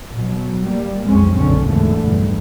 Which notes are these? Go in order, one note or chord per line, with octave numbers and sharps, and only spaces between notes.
B2 F#3
G3 A#3
B1 F2 G#3 C4 C#4
F#1 B1 D3 C#4
G#1 D#2 G#2 D3 E3 A3
B1 E2 G2